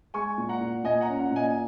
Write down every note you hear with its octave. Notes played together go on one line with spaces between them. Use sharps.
G#3 G#5 C#6
A#2
F#5 A#5
A#2
A#2 D#5 G#5
F#5 A#5
C#4
F#5 A#5
A#2
D#5 G#5